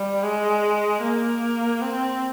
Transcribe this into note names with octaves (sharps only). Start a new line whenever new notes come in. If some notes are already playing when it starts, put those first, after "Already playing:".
Already playing: G3
G#3
A#3
C4